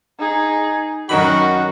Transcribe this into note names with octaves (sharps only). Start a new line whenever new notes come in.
D#4 G#4
F#2 D#3 D#4 F#4 B5